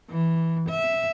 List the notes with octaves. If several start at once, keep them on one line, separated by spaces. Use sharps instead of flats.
E3
E5